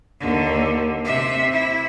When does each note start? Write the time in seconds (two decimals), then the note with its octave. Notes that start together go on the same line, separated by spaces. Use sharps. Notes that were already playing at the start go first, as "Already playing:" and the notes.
0.20 D#2 D3
1.04 C3 E5
1.52 E4